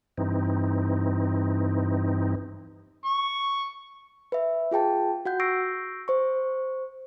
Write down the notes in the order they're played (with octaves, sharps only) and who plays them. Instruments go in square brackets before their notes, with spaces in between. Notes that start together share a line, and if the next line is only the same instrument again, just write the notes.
[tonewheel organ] G2 E3 C4 D#4
[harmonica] C#6
[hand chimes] B4 E5
F4 G#4 G5 A5
F#4 F#5 G6
C#6 E6 G6 A#6 C7 D7
C5 C#6